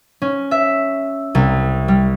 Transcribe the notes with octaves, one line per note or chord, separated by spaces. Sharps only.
C#4
E5
C2
G3